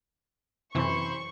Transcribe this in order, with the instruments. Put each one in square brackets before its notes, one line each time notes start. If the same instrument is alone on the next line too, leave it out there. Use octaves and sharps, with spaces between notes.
[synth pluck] F#2 C3 E3 [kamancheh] C5 B5 [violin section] C#6